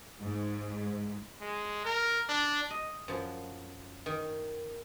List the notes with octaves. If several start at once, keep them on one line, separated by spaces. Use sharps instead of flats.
G#2
G#3
A#4
D4
D#5
F#2 F3
D#3